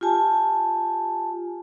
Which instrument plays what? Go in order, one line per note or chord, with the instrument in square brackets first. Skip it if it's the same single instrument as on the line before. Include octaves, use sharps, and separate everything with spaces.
[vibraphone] F4 G4 G#5 A5